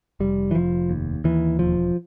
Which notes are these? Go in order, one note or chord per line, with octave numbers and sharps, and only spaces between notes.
F1 G3
E3
F1 F3
D#2
D#2 E3
E1 F3